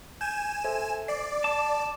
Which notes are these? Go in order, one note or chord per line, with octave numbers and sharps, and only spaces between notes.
G#5 G6 E7
A4 C5 E5
D5 C7
A5 D6